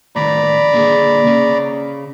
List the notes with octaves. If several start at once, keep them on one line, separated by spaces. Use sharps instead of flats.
A2 D#3 D5 A#5 B5
D3 A#3 G#4
C#3 C#4